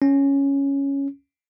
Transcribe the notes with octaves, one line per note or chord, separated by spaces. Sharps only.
C#4